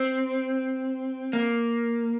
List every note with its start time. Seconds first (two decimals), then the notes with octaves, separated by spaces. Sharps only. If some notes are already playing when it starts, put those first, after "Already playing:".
Already playing: C4
1.33 A#3